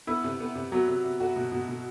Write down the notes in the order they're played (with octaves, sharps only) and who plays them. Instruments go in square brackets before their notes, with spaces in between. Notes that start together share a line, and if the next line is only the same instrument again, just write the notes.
[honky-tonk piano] B3 [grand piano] E4
[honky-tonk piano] C3
B3
C3
[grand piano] F#3 [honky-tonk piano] B3
[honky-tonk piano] C3
C3
F#4
B2
B2
B2